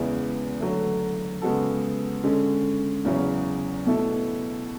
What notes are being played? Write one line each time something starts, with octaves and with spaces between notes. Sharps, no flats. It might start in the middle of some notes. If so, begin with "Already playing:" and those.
Already playing: E2 C#3 G#3 B3 E4
D3 F#3 A3
C#3 G#3 B3 F#4 A4
D3 G#3 C#4
E2 C#3 F#3 C#4 E4
B2 A3 E4 A4